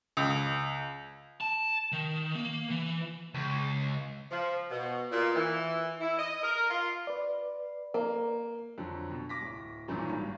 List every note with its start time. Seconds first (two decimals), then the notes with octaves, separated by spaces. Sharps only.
0.17 C#2
1.41 A5
1.92 D#3
2.35 A#3
2.70 E3
3.34 C#2
4.30 F3
4.71 B2
5.11 A#2
5.35 E3
6.01 E4
6.18 D#5
6.43 A#4
6.70 F4
7.07 B4 D5
7.94 A#3
8.78 F2 D3 F#3
9.11 B2
9.29 D6 A#6 B6
9.41 D1
9.88 A#1 G2 A#2 D#3 E3 F#3
10.09 G#1 G2